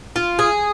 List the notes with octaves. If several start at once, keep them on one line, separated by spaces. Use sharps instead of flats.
F4
G#4